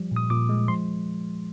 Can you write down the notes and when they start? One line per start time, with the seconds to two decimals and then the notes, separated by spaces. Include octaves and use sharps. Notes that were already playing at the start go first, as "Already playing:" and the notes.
Already playing: F3 G3
0.11 A#2
0.16 D#6
0.30 A#2 D6
0.49 G#3
0.68 F3 C6